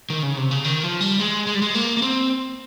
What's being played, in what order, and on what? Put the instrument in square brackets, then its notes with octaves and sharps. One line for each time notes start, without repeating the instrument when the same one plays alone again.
[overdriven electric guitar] D#3
C#3
C3
C#3
D#3
F3
G3
G#3
G#3
G3
G#3
A#3
A#3
C4